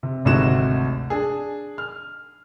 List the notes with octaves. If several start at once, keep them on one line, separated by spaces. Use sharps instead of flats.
C3
G#1 D2 C3 D#4 F#4 E7
D4 G#4
F6